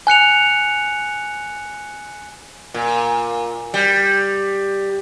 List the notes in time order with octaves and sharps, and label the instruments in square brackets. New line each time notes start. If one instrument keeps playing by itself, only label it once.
[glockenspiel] G#5 F#6 C#7 F7
[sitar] A#2
G3